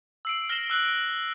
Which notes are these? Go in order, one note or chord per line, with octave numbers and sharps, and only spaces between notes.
E6 C7 D7
F6 A#6 C7 D7 E7 G7
E6 F#6 D7